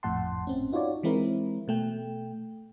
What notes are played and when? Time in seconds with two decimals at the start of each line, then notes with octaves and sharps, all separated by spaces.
0.03 G#1 F2 A2 F#5 A5 C6
0.47 G#1 C4 C#4
0.73 D#4 F4 F#4 C#5 D5
1.03 E3 G#3 C4 E4 A#4
1.68 B2 A3 G5